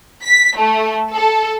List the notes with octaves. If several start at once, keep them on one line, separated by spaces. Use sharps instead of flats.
B6
A3
A4